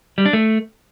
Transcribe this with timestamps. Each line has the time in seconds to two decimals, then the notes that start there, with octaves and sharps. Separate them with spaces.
0.18 G3
0.26 D4
0.33 A3